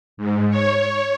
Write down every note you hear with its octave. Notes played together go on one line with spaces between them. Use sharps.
G#2
C#5